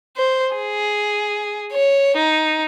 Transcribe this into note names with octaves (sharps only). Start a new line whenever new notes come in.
C5
G#4
C#5
D#4